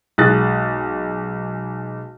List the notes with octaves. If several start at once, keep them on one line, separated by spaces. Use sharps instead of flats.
B1 G#3 D#6 F#6 A6